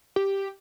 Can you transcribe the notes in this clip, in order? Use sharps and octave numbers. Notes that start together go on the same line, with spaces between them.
G4